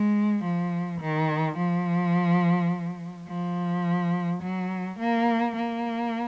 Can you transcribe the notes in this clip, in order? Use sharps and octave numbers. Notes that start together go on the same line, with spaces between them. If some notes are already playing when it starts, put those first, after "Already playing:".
Already playing: G#3
F3
D#3
F3
F3
F#3
A#3
A#3